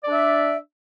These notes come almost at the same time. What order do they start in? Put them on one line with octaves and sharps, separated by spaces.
D5 D4 E5